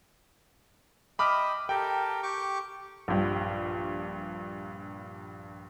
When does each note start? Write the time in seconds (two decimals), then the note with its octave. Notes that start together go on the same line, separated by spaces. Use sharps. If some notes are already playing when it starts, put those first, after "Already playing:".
1.19 D#5 E5 G5 B5 D6 F6
1.69 G4 A4 A#4 G5
2.23 G4 C#6 D6
3.08 A#1 G2